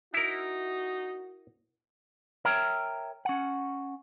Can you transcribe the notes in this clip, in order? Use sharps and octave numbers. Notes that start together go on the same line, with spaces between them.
D#4 E4 F#4 A#4
A#4 C#5 E5 G5 A#5
C#4 F#5